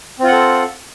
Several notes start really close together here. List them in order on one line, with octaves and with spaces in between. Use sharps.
C4 F4 F#5 A4